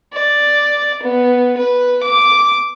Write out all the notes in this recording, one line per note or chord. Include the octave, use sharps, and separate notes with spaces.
D5
B3
B4
D6